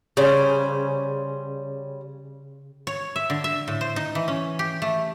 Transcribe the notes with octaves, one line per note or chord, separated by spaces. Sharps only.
C#3 G3 C#4 C5
C#5
E5
D3
E5
A2
C5
D#4
E3
C#4
G4
A3